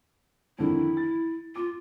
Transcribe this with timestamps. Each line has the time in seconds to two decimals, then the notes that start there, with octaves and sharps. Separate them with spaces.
0.59 F2 D3 D#3 E4
0.97 A6
1.56 F4 D6